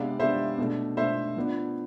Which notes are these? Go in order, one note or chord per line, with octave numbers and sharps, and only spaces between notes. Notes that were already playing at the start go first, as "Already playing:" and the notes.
Already playing: C3 G#3 B3 D4 D5 F5
C3 G#3 B3 D4 C5 E5
B2 A3 D4
B2 A3 D4 C5 E5
F3 B3 D4